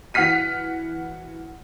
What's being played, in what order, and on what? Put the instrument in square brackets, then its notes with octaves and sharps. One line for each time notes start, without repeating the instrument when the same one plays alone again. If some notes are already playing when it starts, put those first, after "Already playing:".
[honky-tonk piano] E3 F#4 F#5 F6 B6 D#7